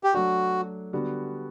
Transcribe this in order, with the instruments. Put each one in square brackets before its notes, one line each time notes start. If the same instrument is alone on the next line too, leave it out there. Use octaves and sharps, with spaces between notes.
[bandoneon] G4
[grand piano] F#3 A3 D4 [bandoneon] F#4
[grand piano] D3 G3 B3 F#4